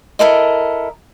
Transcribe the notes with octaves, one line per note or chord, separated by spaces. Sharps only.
E4 A4 A#4 D#5